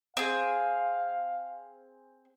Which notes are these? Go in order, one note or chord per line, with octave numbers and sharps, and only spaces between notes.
C4 G#4 F5